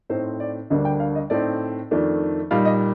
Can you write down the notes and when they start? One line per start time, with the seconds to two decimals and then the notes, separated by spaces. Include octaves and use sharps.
0.10 A2 A3 C4 D#4 C5
0.40 D5
0.70 D2 D3 G3 A#3 D4 D#5
0.85 G5
1.00 F5
1.15 D#5
1.30 A2 A3 C4 D#4 D5
1.91 F2 D#3 A3 D4
2.51 A#2 G3 A#3 D#4 F5
2.65 D#5